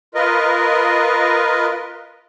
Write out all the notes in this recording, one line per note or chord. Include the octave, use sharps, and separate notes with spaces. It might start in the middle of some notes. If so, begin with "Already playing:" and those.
F4 A#4 B4 D#5